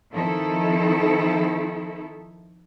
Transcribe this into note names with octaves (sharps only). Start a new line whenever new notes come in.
D#3 F3 C4 D#4 E4 A4